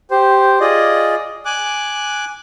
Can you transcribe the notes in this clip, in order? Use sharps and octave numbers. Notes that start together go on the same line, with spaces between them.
G4 C5
F4 G#4 D5 D#5
G#5 D6 F#6